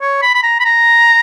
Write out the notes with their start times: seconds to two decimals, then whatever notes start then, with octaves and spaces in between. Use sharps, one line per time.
0.01 C#5
0.22 B5
0.35 B5
0.43 A#5
0.60 B5
0.65 A#5